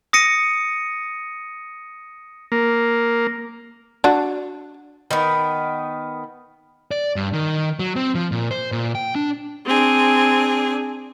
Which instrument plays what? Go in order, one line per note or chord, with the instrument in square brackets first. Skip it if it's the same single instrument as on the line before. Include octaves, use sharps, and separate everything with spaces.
[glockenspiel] D#6 A#6 C#7 D#7
[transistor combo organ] A#3
[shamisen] D4 F#4
[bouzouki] D#3 B3
[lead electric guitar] D5
G2
D#3
F#3
C4
F3
A#2
C5
A#2
G5
D4
[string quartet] C4 D4 G#4